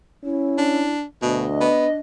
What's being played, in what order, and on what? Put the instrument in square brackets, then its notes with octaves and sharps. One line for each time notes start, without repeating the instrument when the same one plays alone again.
[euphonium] C#4 [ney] E4
[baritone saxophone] D4
[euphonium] D2 [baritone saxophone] B2 [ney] D4 [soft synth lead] D#5
[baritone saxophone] B3